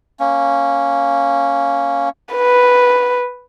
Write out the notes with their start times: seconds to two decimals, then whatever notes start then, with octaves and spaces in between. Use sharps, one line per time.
0.20 A#3 C#4
2.34 B4